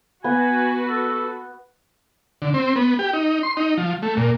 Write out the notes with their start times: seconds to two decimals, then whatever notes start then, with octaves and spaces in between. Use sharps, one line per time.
0.24 B3 F#4 B4 G#5
0.89 A4
2.42 D3
2.54 C4
2.76 B3
2.99 G4
3.13 D#4
3.43 C6
3.57 D#4
3.78 F3
4.02 A3
4.17 A#2